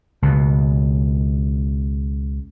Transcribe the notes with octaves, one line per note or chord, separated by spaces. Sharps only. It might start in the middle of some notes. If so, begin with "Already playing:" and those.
C#2 B2